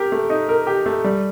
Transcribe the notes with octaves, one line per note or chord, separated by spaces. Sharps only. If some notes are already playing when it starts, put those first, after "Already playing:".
Already playing: G4 A#4
A3
D#4
A#4
G4
A3
G3